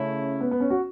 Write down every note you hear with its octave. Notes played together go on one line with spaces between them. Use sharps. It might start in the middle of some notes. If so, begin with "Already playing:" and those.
Already playing: C#3 A3 C#4 E4
B3
B3
C#4
F#4